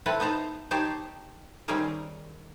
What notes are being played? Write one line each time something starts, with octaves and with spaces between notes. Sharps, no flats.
C4 E4 A4 B4 F#5
B3 D#4 C5 A5 A#5
D#4 G4 C5 C#5 A5
D#3 G3 C4 C#4 G#4 A#4